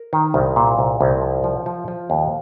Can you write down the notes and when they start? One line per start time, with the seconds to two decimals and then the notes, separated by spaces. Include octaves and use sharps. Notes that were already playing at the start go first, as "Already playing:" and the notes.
Already playing: A#4
0.13 D#3
0.34 C2
0.56 A#2
0.79 C2
1.01 C2
1.21 F3
1.44 F3
1.66 F3
1.88 F3
2.10 D#2